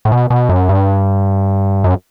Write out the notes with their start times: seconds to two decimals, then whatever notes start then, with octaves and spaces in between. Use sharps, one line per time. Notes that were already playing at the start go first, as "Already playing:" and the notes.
0.05 A2
0.12 B2
0.30 B2
0.49 F#2
0.69 G2
1.84 F#2